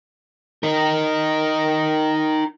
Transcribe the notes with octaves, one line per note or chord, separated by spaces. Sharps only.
D#4 A#4